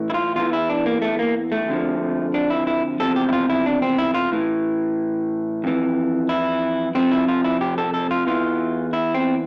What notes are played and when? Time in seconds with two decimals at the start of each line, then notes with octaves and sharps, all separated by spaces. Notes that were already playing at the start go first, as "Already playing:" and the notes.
Already playing: A2 E3
0.10 E4
0.14 F4
0.36 E2 E3 F4
0.53 E4
0.69 D4
0.86 A#3
1.02 A3
1.19 A#3
1.52 A3
1.68 F2 D3 F3
2.34 D4
2.50 E4
2.67 E4
3.00 E2 C3 F3 A4
3.16 G4
3.29 E4
3.33 F4
3.50 E4
3.66 D4
3.82 C4
3.98 E4
4.15 F4
4.32 A2 E3
5.64 F2 E3
6.29 E4
6.95 F2 C3 F3 C4
7.11 E4
7.28 F4
7.44 E4
7.61 G4
7.78 A4
7.94 A4
8.11 F4
8.27 E2 E3 F4
8.93 E4
9.14 C4